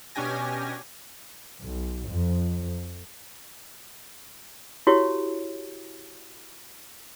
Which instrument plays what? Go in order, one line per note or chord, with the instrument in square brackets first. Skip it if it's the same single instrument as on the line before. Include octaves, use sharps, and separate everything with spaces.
[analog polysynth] B2 C#4 D4 G4 G#5 A#6
[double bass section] B1
F2
[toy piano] E4 F#4 G4 C#5